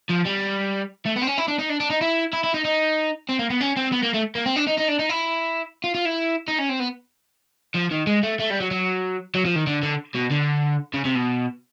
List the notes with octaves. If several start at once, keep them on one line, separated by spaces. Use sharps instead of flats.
F3
G3
A3
B3
C4
C#4
E4
D4
D#4
D4
D4
D#4
E4
E4
E4
D#4
D#4
C4
A#3
B3
C#4
C4
B3
A#3
A3
A#3
C4
D4
D#4
D#4
D4
D#4
E4
F4
F4
E4
D#4
C#4
C4
B3
F3
D#3
G#3
A3
A3
G3
F#3
F#3
F#3
F3
D#3
D3
D3
B2
D3
C#3
C3
B2